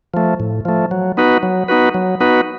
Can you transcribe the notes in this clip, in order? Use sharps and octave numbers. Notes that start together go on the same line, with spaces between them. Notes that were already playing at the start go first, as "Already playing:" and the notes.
F3 A3
A2
F3 A3
F#3
B3 D#4 F#4 B4
F#3
B3 D#4 F#4 B4
F#3
B3 D#4 F#4 B4